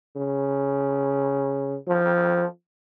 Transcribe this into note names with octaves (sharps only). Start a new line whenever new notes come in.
C#3
F3